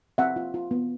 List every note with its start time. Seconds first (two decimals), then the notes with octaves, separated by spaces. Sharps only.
0.18 C4 E5 F#5
0.36 F4
0.54 F4
0.71 B3